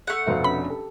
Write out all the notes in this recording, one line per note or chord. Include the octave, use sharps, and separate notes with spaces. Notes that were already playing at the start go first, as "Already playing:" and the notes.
A3 F#5
F1 B2 A4 C5 E5 F5
C#4 D4 B5
G4 A4